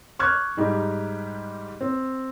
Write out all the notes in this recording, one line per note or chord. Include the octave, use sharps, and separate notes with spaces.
C#6 D6 F6 F#6 G#6
G#2 G3 D#4 G4
C4